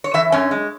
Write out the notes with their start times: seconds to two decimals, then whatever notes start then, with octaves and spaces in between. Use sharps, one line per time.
0.04 C#5
0.14 E3 E5
0.32 F#2 C#4
0.51 G#3